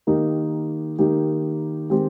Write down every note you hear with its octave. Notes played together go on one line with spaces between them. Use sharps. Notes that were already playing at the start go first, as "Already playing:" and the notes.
D#3 A#3 D#4 G4
D#3 A#3 D#4 G4
D#3 G#3 C4 G4